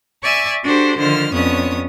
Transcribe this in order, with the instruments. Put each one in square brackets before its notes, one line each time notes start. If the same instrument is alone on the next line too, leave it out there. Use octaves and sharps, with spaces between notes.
[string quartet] D5 E5 G#5 C#6 E6
D4 F#4 G4 A4 C5
D3 D#3 F3 C5 F6
F2 B3 C#4 D4 C#5 D#6